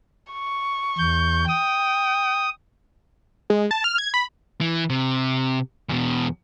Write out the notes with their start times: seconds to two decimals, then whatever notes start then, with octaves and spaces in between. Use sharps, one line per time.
0.33 C#6
0.98 E2 G6
1.48 G5 D#6
3.50 G#3
3.71 A5
3.84 F6
3.98 G#6
4.14 B5
4.61 E3
4.90 C3
5.89 E2 B2